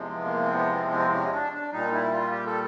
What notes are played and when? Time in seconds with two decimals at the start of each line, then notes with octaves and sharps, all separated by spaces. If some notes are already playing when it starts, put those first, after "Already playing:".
Already playing: E2 C3 F3 G#3
0.13 B3
0.24 A#3
0.43 C4
0.53 B3
0.74 C4
0.93 C4
1.13 C#4
1.33 D4
1.53 D4
1.72 A#2 G3 D#4
1.92 E4
2.12 F4
2.31 G4
2.46 A4